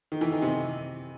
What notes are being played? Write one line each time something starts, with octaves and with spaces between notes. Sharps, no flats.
D#3
E3
D#3
C3